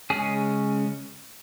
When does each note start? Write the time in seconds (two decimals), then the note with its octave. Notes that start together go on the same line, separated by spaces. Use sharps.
0.10 C#3 G#3 C#4 G#4